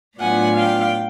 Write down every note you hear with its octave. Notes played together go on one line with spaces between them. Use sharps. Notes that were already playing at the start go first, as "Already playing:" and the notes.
A2 F#3 B3 D4 F4 F#5 G#5
F5 G5